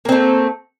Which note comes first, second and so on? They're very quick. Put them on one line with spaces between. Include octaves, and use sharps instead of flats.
A#3 C4 A3